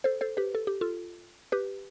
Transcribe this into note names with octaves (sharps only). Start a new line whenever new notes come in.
A4 C5
A4 C5
G4 B4
A4
G4
F4 A4
G4 B4